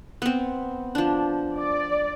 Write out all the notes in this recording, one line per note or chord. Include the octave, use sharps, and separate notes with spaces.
B3 C4
F3 D4
D5